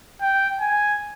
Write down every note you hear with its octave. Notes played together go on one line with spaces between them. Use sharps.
G5
G#5